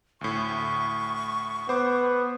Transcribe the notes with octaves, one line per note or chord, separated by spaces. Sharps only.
D2 A2 C#6
B3 C5 D6